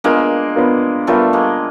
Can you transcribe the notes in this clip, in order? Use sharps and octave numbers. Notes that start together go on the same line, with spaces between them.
G#3 A#3 B3 D4 F4 A#4
B3 D4 F4 A#4
G3 A3 B3 D4 F4 A#4
G#3 A#3